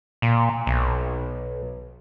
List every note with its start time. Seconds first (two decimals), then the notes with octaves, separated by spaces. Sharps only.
0.22 A#2
0.66 B1